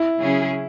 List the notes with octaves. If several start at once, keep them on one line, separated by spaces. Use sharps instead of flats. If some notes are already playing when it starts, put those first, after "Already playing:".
Already playing: E4
C#3 F#3 C#4 G#4